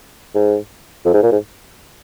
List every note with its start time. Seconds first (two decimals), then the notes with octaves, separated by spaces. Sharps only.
0.35 G#2
1.05 F2
1.14 G#2
1.23 A#2
1.32 G#2